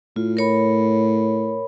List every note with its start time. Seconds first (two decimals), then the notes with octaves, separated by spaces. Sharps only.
0.16 A2 F4
0.37 A#4 C#5 B5